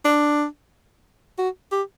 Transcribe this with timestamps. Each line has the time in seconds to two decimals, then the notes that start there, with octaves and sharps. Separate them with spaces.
0.05 D4
1.39 F#4
1.72 G4